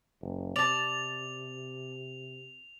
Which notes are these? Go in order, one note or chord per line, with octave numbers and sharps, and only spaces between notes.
F#1
C3 D5 A5 F7